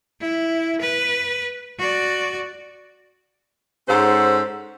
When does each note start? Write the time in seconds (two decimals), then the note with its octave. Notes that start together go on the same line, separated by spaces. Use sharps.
0.20 E4
0.81 B4
1.79 F#4 D5
3.88 G#2 C#4 A4 C5 F#5